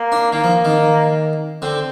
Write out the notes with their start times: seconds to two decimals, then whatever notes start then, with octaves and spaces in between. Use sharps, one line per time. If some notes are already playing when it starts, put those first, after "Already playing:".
Already playing: A#3
0.12 D4
0.33 D#3 A#3
0.44 F3
0.65 D#3
1.62 D3 C4